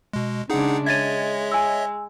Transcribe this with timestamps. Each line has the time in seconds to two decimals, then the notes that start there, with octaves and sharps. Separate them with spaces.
0.13 B2 G#3
0.50 C#3 G#3 D4 D#4 G#4 F#5
0.86 G#3 C#5 D#5 E5 G#6 A6 D#7
1.52 G#5 E6